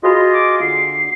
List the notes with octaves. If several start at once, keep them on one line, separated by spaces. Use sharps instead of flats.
F4 F#4 G#4 C5 D#5 B5
D6
D3 C7